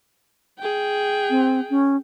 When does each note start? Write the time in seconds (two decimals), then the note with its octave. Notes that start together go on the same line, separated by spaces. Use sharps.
0.59 G#4 G5
1.30 C4
1.70 C#4